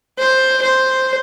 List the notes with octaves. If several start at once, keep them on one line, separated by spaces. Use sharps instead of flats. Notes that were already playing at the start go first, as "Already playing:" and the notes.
C5
C5